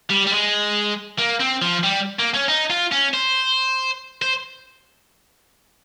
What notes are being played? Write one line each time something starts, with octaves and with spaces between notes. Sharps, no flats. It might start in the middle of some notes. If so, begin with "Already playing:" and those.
G3
G3
G#3
A#3
C4
F3
G3
A#3
C#4
D#4
F4
C#4
C5
C5